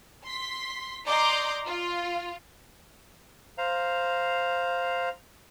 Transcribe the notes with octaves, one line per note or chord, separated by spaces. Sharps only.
C6 B6
D5 D#5 A#5 C6 D6 G6
F4
C5 F5 A#5